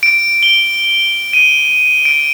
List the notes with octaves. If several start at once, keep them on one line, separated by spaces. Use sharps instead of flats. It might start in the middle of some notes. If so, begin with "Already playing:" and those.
D7
G7
D#7
D7